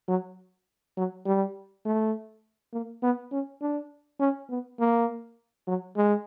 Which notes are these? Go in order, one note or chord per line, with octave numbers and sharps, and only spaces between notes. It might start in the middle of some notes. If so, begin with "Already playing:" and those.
F#3
F#3
G3
A3
A#3
B3
C#4
D4
C#4
B3
A#3
F#3
G#3